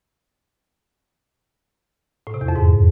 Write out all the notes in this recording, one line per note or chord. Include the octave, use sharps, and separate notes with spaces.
A2
C3
E2
F2
G#2